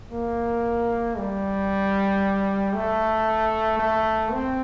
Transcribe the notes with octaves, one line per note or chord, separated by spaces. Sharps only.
A#3
G3
A3
A3
C4